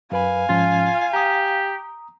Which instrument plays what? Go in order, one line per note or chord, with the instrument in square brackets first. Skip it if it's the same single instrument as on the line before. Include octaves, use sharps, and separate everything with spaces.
[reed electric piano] F#2 B4 B5 [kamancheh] F5 G#5
[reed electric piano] G#2 F3 C#4 [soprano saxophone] F4
[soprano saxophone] G4 [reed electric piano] A#5 D#6